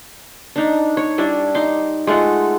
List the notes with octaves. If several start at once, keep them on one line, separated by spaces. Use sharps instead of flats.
D4 D#4
C#5
G3 D4 E4
D#4 C6 D6
G#3 A3 F4 F#5